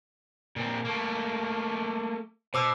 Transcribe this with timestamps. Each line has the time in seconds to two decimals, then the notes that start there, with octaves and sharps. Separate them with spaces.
0.56 A#2 C4
0.85 A3 A#3
2.54 B2 C5 D6 E6